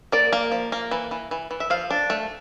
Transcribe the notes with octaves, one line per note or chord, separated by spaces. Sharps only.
A#3 D5
A#3
F3
A#3
E3
E3
E3
E3
E5
F3 F5
D4
A3